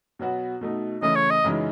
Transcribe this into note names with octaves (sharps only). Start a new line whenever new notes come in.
B2 F#3 B3 F#4
B2 A3 D#4
C#3 E3 A3 D#5
C#5
D#5
F#2 C#3 E3 G#3 D#4